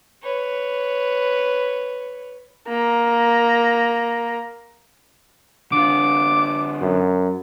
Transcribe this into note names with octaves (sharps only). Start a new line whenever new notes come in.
B4 C#5
A#3 A#5
D3 F4 D6
F#2